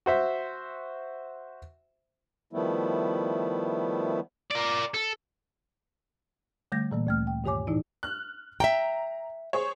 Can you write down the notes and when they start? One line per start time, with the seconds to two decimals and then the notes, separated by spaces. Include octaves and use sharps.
0.06 F#4 C5 E5
2.53 D#3 F3 G3 A3 B3 E4
4.51 A#4 D5
4.94 A4
6.72 D3 G3 A3 G6 A#6
6.91 A#2 E3 A#3
7.07 D2 A3 F6
7.27 G5
7.44 G2 D#3 G4 C#5 G#5 D6
7.67 A2 E3 D#4 E4
8.03 F6 F#6
8.60 E5 F#5 G5 A#5
9.53 G#4 C5 C#5